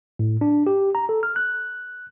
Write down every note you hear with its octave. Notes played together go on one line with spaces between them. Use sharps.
A2
D4
G4
A#5
A4
F6
F#6